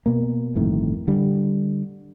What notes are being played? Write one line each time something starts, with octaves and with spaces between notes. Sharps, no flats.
B2 A#3
G1 F2 A2 D#3
D3 G3